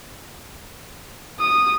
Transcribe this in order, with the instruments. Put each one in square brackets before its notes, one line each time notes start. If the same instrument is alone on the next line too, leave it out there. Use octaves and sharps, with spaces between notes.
[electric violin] D#6